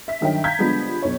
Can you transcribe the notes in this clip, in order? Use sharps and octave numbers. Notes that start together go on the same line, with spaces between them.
E5 B6
G2 D#3 F#3 E5 G5
F5 A#5 G6 G#6 B6
D3 F3 G3 G#3 B3 D4
B1 C#5